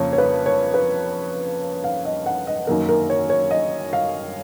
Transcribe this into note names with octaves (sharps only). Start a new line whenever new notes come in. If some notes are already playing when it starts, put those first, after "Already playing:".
Already playing: F2 C#3 F3 A#3 C#5
C#5
B4
C#5
B4
F5
D#5
F#5
D#5
F#2 D#3 A#3 D#4 A#4
A#4
C#5
C#5
D#5
F5